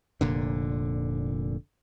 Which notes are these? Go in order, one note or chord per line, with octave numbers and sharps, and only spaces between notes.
F1 A#2 D3